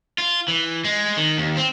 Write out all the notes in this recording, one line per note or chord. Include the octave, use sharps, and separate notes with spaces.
F4
E3
G#3
D#3
D#2
C4